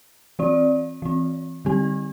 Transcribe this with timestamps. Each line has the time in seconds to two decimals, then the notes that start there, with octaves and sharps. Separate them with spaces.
0.39 E3 C4 D5
1.02 E3 C4
1.65 D3 G3 C4 G4